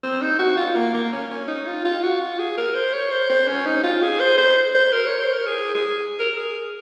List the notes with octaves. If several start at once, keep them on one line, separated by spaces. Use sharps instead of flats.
C4
D#4
F#4
F4
A#3
A#3
C#4
C#4
D#4
F4
F4
F#4
F4
G#4
A#4
C5
C#5
C5
C5
C#4
D#4
F4
G#4
C5
C5
C5
A#4
C#5
C5
A#4
G#4
G#4
A#4
G#4